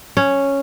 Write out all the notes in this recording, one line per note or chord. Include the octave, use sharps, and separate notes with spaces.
C#4